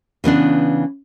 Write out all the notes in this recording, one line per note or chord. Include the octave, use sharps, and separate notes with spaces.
C#3 E3 B3 D4